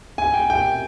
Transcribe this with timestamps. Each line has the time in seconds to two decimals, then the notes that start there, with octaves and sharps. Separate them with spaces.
0.18 G#5
0.34 G5
0.50 G5